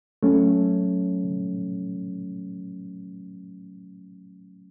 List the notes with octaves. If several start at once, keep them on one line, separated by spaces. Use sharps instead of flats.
F#3 A3 C#4